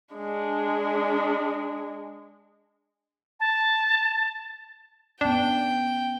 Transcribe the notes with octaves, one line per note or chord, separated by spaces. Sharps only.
G#3 D4
A5
B3 C#4 D4 G5